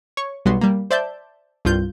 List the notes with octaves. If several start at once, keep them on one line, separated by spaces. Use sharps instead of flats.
C#5 C#6
B1 G3 B3 F#4 C6
G3 A#3
C5 D5 E5 A5 G6
C2 G2 F4 G6